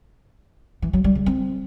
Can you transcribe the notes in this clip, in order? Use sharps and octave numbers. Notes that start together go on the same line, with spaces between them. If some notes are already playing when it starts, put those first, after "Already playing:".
E3
F#3
G3
C#3
C4